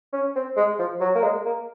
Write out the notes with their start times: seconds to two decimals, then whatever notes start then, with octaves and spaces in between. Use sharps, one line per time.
0.13 C#4
0.35 C4
0.57 G#3
0.79 F3
1.01 F#3
1.15 A#3
1.23 G#3
1.45 A#3